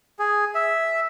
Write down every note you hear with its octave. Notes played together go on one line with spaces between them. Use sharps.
G#4
E5